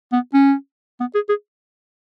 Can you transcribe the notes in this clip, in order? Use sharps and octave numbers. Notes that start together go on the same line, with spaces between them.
B3
C#4
B3
G#4
G#4